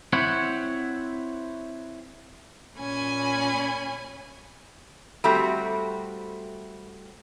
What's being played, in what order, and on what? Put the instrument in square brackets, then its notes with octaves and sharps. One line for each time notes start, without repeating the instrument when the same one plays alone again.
[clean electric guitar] C4 E4 C5 C#5 F#5
[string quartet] A#2 C#4 G#5 B5
[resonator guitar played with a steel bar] G3 A3 C4 F#4